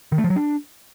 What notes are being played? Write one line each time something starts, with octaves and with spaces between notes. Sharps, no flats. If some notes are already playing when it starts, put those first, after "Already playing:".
D#3
A3
F3
F#3
D4